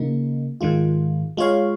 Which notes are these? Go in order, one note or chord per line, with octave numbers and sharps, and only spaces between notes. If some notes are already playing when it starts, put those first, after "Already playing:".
Already playing: C#3 A#3 D#4
G#2 D#3 G#3 F4
G#3 F4 C#5 F5